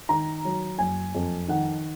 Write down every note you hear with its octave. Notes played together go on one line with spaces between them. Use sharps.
D#3 A#5
F#3
F#1 G#5
F2
D#3 F#5